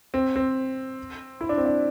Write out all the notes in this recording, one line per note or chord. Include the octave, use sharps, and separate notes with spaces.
C4
C4
E4
D4
C4
D4